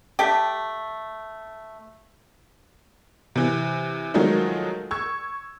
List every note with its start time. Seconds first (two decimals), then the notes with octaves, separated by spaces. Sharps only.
0.19 A3 G4
3.36 C3 E3
4.14 D#3 F3 F#3 G#3 A3 D#4
4.91 C#6 E6 G#6